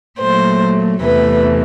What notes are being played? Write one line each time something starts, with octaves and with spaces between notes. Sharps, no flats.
A#2 F#3 A3 C5
E2 C3 E3 A3 B4